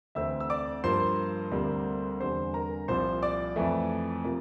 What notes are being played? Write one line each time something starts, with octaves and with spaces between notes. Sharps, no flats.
D2 C3 E3 A3 C4 E5 E6
E6
D5 D6
G2 F3 A#3 C5 C6
D2 C3 G3 A#3
E2 D3 G3 C4 C5 C6
A#4 A#5
C2 A#2 F3 C5 C6
D5 D6
F2 E3 A3
C3 F3 A#3